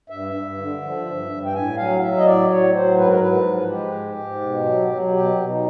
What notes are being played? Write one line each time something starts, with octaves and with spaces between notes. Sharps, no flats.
G2 E5
G2
D3
F3
G2
G2
G5
A2 G#5
F#3 F5
F#3 E5
D#5
A2 D5
A2 C#5
F#3 C5
G#2 B4
A#4
G#2 B4
F3
G#3 G4
G#2
G#2
B2
F#3
F#3
B2 G4
B2
D#4